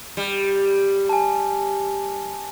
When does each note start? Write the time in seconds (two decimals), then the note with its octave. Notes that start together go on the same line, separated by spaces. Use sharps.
0.17 G3
1.09 G#5 A5